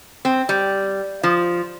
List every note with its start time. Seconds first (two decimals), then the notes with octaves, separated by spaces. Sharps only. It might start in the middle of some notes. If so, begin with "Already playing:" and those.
0.25 C4
0.49 G3
1.23 F3